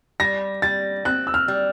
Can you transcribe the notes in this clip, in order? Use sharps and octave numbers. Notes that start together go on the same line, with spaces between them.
G3 A#6
G3 A6
C4 F#6
E6
F6
G3